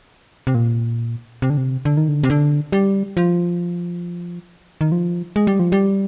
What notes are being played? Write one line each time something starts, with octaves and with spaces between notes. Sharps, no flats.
C3
A#2
C3
D3
C3
D3
D#3
D3
C3
D3
G3
F3
D#3
F3
G#3
G3
F3
G3